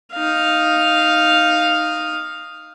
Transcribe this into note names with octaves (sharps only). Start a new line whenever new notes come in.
D#4 F5